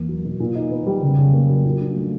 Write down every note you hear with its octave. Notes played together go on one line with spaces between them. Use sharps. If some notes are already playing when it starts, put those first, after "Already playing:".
Already playing: E2 A#3
F#3
B2
A#2
D#4
B3
G3
C#3
C#3
A#3
F#3
A#2
D4
A3